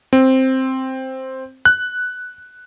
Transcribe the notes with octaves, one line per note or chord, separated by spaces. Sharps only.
C4
F#6